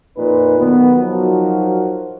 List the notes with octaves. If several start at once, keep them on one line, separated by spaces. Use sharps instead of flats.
F2 A#2 D#4 B4
B1 D#3 B3
F3 F#3 D#4 F#4 A#4